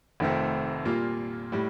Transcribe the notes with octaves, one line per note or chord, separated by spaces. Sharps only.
F1 F2 D#3 A3 C4
A#2 G3 A#3 F4
A2 G3